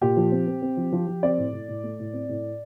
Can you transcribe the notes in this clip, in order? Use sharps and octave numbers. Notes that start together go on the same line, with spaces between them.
A#2 G4
F3
C4
C4
C4
F3
F3
F3
C4 D5
A2
A2
A2
A3
A2
C4
A2